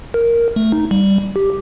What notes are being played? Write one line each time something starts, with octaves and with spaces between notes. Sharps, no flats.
A#4
A3
D#4
G3
G4